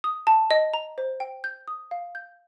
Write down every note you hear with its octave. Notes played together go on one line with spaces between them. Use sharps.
D#6
A5
D#5
A#5
C5
G5
G6
D#6
F5
G6